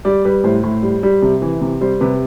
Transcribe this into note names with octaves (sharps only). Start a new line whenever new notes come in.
G3 D5
G3 B4
A2 C5
A2
G3
G3
C3
E3
C3
G3 C5
C3 B4